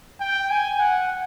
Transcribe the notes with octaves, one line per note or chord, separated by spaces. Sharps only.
G5
G#5
F#5